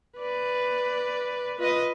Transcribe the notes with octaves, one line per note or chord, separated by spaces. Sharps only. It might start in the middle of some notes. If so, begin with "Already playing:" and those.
B4 D5
F4 B4 D#5